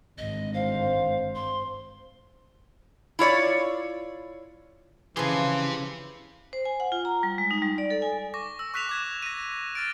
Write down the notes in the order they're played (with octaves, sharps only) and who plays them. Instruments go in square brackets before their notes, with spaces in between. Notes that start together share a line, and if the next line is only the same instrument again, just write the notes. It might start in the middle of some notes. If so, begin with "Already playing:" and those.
[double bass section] G#1 G2 D3 [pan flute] D#5
[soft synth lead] C5 [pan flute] F5
[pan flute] C6
[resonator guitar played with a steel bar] E4 F4 C#5 D5
[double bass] C#3 [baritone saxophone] E3 [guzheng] F3 G#4 [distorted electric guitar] G4 C6
[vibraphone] C5
G#5
F#5
F4
A#5
G3
G#3
D#4
G3
D5
A4
G#5
[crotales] C#6 D6 A#6
E6
C#6 F#6 B6 E7 F7
D6 G#6 E7
A#6 D#7
F6 A6 D7